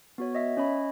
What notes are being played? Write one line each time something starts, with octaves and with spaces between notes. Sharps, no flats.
B3 F#4 C#5
D#5 E5
C#4 C#5 D#5 B5